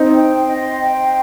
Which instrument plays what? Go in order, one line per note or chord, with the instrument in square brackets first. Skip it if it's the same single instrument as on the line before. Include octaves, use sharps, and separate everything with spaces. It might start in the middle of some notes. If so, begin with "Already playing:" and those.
Already playing: [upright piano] C4 D#4
[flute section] G5
C5
D#5
C5
G5
C5